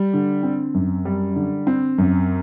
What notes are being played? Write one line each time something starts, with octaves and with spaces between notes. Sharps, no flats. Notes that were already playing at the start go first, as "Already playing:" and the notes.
Already playing: G3
D3
C4
F#2
G3
D3
C4
F#2